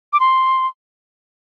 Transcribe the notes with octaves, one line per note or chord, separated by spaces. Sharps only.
D6
C6